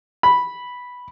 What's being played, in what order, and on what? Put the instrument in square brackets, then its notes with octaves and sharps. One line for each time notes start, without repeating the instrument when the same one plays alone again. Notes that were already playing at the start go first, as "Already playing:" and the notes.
[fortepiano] B5